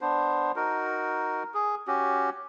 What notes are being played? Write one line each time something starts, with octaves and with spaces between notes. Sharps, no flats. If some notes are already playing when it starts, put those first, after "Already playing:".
B3 D4 C5
D#4 F#4 A#4
G#4
C#4 F#4 G4